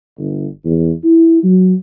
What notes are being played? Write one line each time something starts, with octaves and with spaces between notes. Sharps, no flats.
G1
E2
E4
F#3